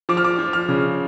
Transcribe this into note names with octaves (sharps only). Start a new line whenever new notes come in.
F3 D6
F6
D6
F3
F6
C#3